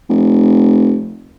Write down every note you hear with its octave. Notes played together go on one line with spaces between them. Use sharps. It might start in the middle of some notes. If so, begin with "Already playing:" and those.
F1